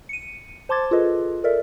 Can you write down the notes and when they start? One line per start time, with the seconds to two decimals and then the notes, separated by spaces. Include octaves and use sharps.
0.09 C#7 D#7
0.69 C5 A5 C6 D6 G#6 A6
0.91 F4 G#4 A4 B4 D#5
1.44 A4 A#4 D5 E5